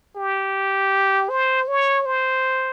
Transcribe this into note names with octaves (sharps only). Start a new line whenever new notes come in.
G4
C5
C#5
C5